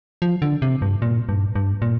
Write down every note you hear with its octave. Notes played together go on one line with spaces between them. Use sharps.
F3
D3
C3
G2
A#2
G2
G2
A#2